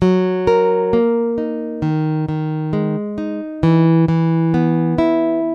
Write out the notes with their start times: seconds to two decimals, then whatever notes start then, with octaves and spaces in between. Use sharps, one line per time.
0.02 F#3
0.47 A#4
0.93 A#3
1.38 D#4
1.82 D#3
2.29 D#3
2.73 G#3
3.18 D#4
3.63 E3
4.08 E3
4.54 B3
4.98 E4